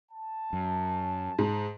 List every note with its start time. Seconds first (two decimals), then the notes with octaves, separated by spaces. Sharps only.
0.11 A5
0.53 F#2
1.39 G#2